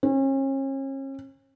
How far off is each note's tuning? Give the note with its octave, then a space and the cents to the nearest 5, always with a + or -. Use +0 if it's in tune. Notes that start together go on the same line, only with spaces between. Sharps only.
C#4 -40